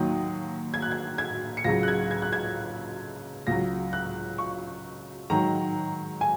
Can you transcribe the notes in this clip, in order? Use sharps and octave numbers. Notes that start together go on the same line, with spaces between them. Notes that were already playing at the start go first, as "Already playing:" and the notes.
Already playing: D#2 D#3 F#3 D#6
G#6
F#6
G#6
G#6
C#7
C#2 C#3 F#3 A#6
F#6
G#6
G#6
F#6
G#6
C#2 C#3 F#3 A#6
F#6
C#6
G#2 D#3 F#3 A#5
G#5